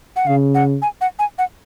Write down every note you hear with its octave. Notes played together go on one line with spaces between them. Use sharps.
F#5
C#3 F5
F#5
G#5
F#5
G#5
F#5